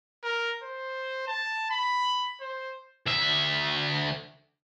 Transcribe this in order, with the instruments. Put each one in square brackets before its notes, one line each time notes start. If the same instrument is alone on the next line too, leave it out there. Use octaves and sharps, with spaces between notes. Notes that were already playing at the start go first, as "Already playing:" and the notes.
[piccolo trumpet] A#4
C5
A5
B5
C5
[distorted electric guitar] D2 E5